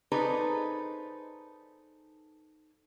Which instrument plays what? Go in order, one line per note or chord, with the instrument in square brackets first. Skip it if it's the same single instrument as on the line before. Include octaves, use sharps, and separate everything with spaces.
[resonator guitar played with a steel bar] D#4 G#4 A4 B4 C5 D5